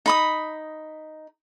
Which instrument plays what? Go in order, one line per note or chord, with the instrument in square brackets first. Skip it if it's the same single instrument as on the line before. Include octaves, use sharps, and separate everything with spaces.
[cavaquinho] D#4 B5 D#6